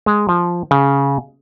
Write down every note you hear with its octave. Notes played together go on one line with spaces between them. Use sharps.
G#3
F3
C#3